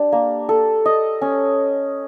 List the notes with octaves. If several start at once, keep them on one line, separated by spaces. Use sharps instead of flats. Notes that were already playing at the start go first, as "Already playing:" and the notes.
Already playing: D4 G4
A#3
A4
D#5
C#4